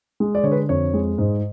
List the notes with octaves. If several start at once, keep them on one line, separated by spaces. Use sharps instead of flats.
G#3
D5
D3 C#5
B4
F2 C#5
G#3
G#2